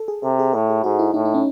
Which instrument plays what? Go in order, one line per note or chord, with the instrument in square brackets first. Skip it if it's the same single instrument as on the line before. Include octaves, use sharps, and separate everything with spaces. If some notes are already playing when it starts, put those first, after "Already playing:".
Already playing: [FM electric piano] A4
G#4
[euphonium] C3 [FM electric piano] A4
[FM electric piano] G#4
[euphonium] A2 [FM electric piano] A4
[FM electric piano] G#4
[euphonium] G#2 [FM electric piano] F#4
[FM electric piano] E4
[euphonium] A2 [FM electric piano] D#4
[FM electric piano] D#4
C#4